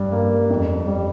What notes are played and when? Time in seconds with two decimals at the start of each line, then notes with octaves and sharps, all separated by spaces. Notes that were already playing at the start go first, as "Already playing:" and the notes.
Already playing: G2
0.12 A#3
0.50 F2
0.87 G3